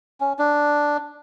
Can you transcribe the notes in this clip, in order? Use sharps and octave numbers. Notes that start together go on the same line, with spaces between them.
C#4
D4